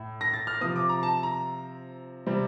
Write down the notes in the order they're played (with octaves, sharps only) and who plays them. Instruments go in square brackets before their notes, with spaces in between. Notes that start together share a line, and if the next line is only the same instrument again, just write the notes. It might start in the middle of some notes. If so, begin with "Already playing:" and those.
Already playing: [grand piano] A2
A#6
A6
F6
C3 F3 C4 D#6
D6
A#5
A5
A#5
C3 G3 C4